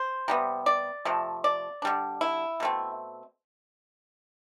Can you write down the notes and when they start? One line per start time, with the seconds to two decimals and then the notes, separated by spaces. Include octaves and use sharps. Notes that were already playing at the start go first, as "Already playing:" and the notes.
Already playing: C5
0.28 C3 G3 B3
0.66 D5
1.05 C3 F3 A3
1.44 D5
1.82 D3 G3 D4
2.21 E4
2.60 B2 A3 C4